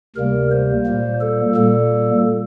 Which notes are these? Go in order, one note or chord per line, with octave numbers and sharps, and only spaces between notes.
D2 C3 G3 A#3 A#4
C5
A#2 G3 A#3
A4
A#2 G3 A#3 A4